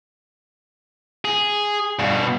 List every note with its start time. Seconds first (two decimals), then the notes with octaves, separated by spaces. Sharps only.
1.25 G#4
1.99 G2 B2